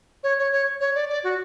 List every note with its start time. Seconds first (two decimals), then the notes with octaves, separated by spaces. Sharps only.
0.23 C#5
0.39 C#5
0.52 C#5
0.80 C#5
0.95 D5
1.09 D5
1.24 F#4